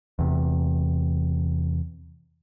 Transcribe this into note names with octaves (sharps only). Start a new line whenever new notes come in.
E2 C3